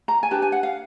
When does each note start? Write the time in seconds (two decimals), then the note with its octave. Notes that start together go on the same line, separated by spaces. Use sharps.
0.08 A#5
0.23 G#5
0.31 D4 G4 B4 A5
0.42 G#5
0.52 F#5
0.63 F5